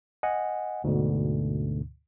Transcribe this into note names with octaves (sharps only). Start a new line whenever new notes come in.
D#5 F#5 G#5
D2 G#2 B2 D3